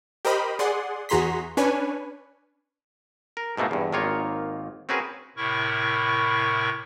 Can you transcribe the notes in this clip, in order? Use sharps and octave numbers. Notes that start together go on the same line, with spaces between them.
G4 A#4 C5 D#5 B5
G#4 D5 F#5 C6
E2 F#4 G#4 A#5 C6 B6
C#4 D4 B4 C#5 G#5
A#4
G#2 B2 A3 A#3 C4
E2 G2
G#1 D#3 A#3 F4 C#5
C4 C#4 F#4 G#4 A#4 B4
A2 C3 E4 A#4 C#6